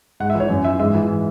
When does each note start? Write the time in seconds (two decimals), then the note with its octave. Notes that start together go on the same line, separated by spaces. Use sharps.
0.20 G#2 F#5
0.30 E5
0.35 E3
0.40 C#5
0.50 F#2
0.64 E3 E5
0.80 G#2 E5
0.95 E3